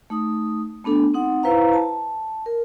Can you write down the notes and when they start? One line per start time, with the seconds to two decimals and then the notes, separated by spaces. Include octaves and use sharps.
0.10 A3 D#4 D#6
0.84 A3 B3 D4 A4
1.14 C4 D#4 F#5
1.43 E4 B4 C5 F5 A#5
1.73 A5
2.46 A#4